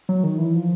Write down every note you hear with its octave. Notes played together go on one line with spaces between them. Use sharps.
F#3
D#3
E3
F3